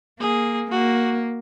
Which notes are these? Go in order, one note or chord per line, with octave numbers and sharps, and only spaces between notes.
A#3 G#4
A#3 F#4